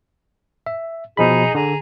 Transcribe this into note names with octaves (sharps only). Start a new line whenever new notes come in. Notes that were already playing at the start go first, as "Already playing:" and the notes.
E5
B2 F3 D#4 G#4 A#5 B5
D3 G#4 A#5